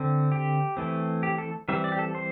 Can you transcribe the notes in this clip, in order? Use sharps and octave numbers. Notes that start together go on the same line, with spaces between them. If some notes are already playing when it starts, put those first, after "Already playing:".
Already playing: D3 C4
G4
E3 A3 C4
G4
A4
E3 G3 C4 E5
D5
G4
A4
C5